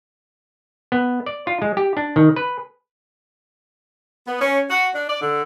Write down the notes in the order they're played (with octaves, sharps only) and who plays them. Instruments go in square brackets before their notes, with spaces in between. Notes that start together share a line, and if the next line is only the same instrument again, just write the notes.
[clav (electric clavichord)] B3
D5
F4
G#3
G4
D4
D#3
B4
[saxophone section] B3
C#4
F#4
D4
D5
D3